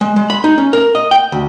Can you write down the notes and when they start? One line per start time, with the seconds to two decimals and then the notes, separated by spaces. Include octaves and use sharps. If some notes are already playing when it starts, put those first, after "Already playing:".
0.01 G#3
0.16 G#3
0.30 B5
0.44 D#4
0.58 C#4
0.73 A#4
0.95 D#5
1.11 G5
1.32 D2